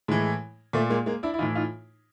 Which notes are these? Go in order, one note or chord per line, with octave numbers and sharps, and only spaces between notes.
A2 E3 G#3
A#2 A3
G#3 A#3
G#3 A#3
D4 E4
E4
A2 E3 D#4 F4
D#4 F4